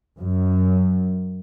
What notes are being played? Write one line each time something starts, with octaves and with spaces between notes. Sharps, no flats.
F#2